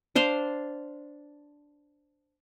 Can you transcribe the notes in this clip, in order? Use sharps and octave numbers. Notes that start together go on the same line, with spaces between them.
D4 C5 F5 C6